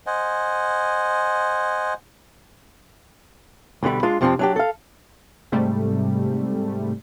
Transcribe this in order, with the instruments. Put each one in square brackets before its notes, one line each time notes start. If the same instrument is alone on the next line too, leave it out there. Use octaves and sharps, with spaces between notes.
[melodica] C5 D#5 F#5 G#5
[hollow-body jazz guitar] C2 B2 D3 G3 B5
G#3 D4 F4
F2 C3 F3 A#3 C4 D4
F#3 D4 G4
A4 F5
[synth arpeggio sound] G#2 C3 G3 A3